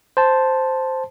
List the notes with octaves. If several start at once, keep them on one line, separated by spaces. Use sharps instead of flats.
C5 A5